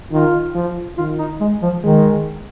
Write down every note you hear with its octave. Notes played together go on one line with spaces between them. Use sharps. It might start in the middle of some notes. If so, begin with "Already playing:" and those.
D#3 F4
F3
D#3 F4
D#4
G#3
F3
D#3 G#3